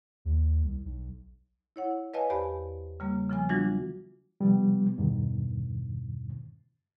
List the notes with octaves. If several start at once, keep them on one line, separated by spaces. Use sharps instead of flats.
D#2
C2
B1
E4 C#5 F#5
B4 C#5 D#5 F5 G#5 A5
E2 G4 C5 D5 B5
C#3 G3 A#3
C#3 F3 B3 G#5
E3 F#3 G3 D4 F4 F#4
C3 F3 G3 B3
E2 G2 B2 D#3